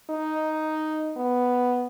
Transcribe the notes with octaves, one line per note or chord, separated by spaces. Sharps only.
D#4
B3